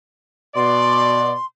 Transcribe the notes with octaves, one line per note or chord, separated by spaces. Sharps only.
B2 D5 C6